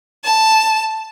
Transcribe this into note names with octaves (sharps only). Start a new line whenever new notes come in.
A5